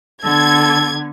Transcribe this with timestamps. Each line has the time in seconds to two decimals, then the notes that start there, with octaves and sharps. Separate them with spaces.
0.24 D3 B3 A4 G#6